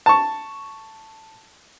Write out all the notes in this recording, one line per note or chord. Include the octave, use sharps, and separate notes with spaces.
A5 C#6